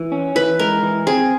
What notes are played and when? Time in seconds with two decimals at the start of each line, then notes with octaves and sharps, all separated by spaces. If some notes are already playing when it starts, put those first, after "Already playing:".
Already playing: E3
0.12 C#4
0.35 E3 B4
0.59 G#3 A#4
0.83 E3
1.07 C4 G#4